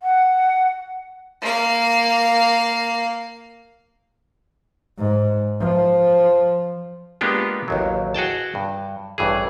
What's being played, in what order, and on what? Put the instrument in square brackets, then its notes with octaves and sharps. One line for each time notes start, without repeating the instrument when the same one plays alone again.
[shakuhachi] F#5
[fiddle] A#3 F5
[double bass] G#2
F3
[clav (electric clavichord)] G#3 A#3 B3 D4 F4 G4
A1 D#2 F#3
F#4 G#4 G5 A5
G2
A1 G2 E3 G#4